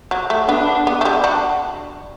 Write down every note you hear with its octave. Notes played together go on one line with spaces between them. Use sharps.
F#3
A3
B3 D4
B3
A3
G3
D4 F#4